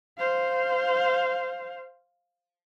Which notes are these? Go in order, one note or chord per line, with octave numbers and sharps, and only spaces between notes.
C5 F5